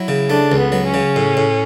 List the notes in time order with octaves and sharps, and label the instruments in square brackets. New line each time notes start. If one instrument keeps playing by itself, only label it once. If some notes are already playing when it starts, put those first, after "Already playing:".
Already playing: [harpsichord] F#3 [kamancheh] E4
[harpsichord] C#3
[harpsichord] A3 [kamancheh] D4
[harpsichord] C#2
[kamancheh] B3
[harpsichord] F#3
[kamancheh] C#4
[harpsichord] C#3
A2
A2